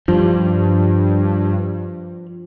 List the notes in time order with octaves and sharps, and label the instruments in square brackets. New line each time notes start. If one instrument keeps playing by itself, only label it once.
[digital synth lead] G2 [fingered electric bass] F3